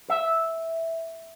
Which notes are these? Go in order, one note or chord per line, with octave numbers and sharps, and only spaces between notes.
E5